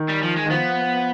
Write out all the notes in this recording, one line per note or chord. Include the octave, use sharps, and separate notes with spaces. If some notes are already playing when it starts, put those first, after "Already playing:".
Already playing: D#3
G3
F3
G#3
D#3
F3 B3